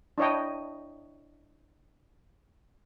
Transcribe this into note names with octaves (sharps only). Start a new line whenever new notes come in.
D4 E4 C#5 D#5 G5